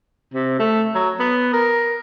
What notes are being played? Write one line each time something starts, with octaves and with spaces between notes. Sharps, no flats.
C3
A3
F#3
B3
A#4